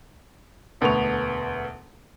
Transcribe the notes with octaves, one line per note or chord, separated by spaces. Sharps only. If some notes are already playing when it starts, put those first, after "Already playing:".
E1 D2 A3 B3 C#6 F7